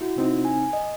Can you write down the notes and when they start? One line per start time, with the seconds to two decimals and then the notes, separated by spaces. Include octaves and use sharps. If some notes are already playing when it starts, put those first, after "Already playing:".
0.01 E4 F#4
0.16 C3 C4 D#4
0.45 G#5
0.73 D#5